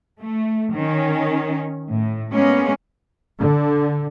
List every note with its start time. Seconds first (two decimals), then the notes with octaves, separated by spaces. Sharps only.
0.20 A3
0.72 D#3 C#4
1.90 A2
2.30 G#3 A#3 B3 C#4
3.38 D3